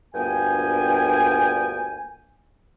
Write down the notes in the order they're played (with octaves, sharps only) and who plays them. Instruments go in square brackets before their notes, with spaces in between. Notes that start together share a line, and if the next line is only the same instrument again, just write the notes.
[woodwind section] D2 G2 A#2 B3 G5 G#5